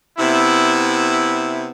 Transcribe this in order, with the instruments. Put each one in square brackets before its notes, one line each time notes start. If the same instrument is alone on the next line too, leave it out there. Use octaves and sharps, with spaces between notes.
[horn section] C3 B3 E4